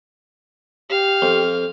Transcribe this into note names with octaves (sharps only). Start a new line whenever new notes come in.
G4 F5
F2